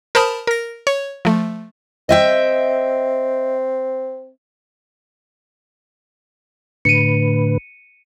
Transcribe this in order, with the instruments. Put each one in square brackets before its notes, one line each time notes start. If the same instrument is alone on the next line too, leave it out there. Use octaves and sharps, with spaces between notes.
[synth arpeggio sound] A#4 C5 A5 B5 D#6 F6
A#4 A#6
C#5
F3 A3
[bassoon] C4 [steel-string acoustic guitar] D#5 E5 G5
[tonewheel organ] A2 D3 B4 [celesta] C#7 D#7